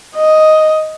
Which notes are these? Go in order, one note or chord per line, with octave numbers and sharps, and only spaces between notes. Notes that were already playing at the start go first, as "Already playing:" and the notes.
D#5